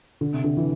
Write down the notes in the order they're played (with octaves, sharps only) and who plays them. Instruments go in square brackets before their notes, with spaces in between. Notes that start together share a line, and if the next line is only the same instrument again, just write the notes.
[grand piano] D3
C3
D3
E3